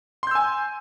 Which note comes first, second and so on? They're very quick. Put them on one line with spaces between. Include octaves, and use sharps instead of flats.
C6 G6 E6 G#5